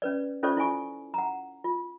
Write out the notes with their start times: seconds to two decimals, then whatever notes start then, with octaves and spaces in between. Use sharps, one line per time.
0.02 C#4 B4 D5
0.43 C#4 F4 A4 C5 D5 C#6
0.57 E4 F4 G#5 C#6
1.14 F#5 A#5
1.64 F4